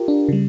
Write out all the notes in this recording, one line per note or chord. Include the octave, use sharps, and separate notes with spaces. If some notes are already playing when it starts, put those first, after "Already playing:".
Already playing: F4 G4 A#4
D4
C#3 G3